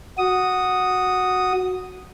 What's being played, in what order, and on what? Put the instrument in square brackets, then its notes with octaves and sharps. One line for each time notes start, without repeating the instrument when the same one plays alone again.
[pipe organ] F#4 D#6